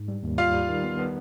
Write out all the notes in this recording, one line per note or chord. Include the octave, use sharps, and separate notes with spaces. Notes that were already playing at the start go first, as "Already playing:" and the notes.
Already playing: G#2
G3
D#2
G3 F4 F5
G3
D#3
B3
B3